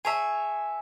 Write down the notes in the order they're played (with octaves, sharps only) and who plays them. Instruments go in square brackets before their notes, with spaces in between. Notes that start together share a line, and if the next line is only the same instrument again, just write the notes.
[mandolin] G#4 C#5 E5 [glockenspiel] G#5 A5